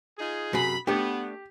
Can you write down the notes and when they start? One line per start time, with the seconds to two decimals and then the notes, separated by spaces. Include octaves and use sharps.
0.18 D#4 F4 G#4
0.53 F#2 C3 G#4 B5
0.87 A3 B3 D4 G4